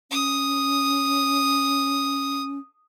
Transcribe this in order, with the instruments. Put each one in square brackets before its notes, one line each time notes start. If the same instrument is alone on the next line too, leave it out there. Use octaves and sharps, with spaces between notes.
[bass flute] C#4 [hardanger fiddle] D#6